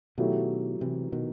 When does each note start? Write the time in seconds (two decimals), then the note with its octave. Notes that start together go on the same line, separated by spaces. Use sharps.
0.18 B2 D#3 F#3 A3 E4 G4
0.81 C3 E3
1.12 B2 D#3